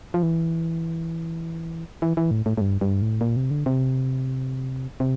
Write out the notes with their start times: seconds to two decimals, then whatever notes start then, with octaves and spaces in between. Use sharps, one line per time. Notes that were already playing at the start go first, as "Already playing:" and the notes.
0.14 F3
0.23 E3
2.02 E3
2.17 E3
2.31 A2
2.46 A2
2.57 A2
2.61 G2
2.81 G2
3.02 A2
3.21 A#2
3.36 C3
3.51 D3
3.66 C3
5.00 C3